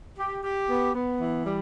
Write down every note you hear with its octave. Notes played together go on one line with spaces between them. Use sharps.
G4
G4
B3
B3
E3
G3